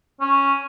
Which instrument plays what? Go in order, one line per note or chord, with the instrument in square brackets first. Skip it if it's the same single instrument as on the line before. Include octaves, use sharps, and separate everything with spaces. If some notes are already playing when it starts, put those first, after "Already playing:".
[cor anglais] C#4